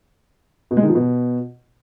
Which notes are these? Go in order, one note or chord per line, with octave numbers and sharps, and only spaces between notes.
B2
G#3
D#3
F3
B2